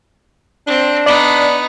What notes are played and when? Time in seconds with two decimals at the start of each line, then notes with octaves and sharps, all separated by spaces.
0.67 C4 D4
1.06 B3 D#4 D5